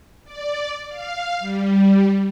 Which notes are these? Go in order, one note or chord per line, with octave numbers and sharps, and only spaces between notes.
D5
F5
G3